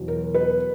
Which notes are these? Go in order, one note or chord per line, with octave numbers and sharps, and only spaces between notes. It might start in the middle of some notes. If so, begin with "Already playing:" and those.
Already playing: E2 B2 F#3
A#4
B4